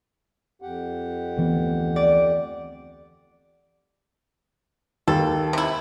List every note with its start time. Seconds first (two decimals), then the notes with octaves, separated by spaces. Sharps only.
0.62 F2 G4 F#5
1.37 D2 E3 B3
1.96 D5
5.08 D#2 A4
5.53 C3 E4